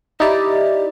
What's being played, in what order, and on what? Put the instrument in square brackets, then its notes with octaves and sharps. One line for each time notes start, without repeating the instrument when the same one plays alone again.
[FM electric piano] D#4 E4 D5 [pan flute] G4